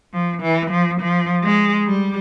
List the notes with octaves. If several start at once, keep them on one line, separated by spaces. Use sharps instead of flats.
F3
E3
F3
F3
G#3
G3